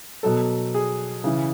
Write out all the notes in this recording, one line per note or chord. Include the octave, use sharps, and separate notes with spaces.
B2 F#3 A4
G#4
C#3 E3